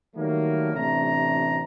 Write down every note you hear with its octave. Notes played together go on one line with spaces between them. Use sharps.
D#3 F#3 G3 A3 A#3
A1 C3 A3 D4 A#5